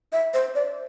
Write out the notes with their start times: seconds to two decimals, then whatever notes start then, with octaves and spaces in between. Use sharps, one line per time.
0.12 E5
0.34 C5
0.55 D5